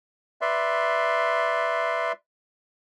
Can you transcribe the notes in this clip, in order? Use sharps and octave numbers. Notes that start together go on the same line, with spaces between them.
B4 D5 E5 C6